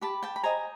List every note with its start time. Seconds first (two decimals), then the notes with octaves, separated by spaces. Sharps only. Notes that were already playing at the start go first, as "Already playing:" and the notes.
0.01 G4 A5 B5
0.23 G5 A5
0.36 B5
0.43 C5 D#5 G#5 A#5